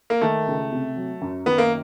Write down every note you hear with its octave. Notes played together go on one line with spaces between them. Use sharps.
A#3
D#3 A3
C#2
C3
F#3
F#2
D#3 B3
A#3